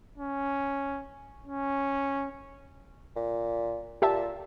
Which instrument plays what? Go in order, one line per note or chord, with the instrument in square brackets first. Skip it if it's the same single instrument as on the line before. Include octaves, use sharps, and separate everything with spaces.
[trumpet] C#4
C#4
[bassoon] A#2
[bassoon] A#2 [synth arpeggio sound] G4 E5 A5